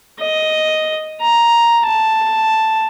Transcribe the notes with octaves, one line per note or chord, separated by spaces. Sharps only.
D#5
A#5
A5